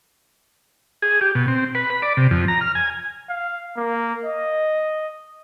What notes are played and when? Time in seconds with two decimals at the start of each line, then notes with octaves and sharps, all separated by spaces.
1.02 G#4
1.21 G4
1.35 B2
1.48 C4
1.75 B4
1.90 B5
2.02 D5
2.17 C3
2.31 F2
2.48 A#5
2.61 F6
2.75 G#5
3.30 F5
3.77 A#3
4.24 D#5